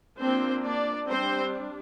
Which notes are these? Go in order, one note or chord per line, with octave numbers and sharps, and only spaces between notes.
F3 A#3 C4 D4 C5
D4 D5
G3 C4 D4 C5